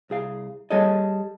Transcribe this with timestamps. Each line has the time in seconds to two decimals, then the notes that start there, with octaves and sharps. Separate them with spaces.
0.10 C2 G#4 F5
0.70 G3 G#4 A4 C#5 D#5